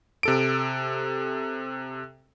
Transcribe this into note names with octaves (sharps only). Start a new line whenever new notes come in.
C3 A4 D7